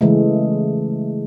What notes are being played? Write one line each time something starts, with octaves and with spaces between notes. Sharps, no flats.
C#3 E3 G#3 A3